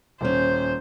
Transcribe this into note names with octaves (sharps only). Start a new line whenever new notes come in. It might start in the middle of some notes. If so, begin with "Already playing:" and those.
D#1 C#4 C5